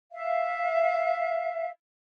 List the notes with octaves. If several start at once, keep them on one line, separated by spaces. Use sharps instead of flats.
E5 F5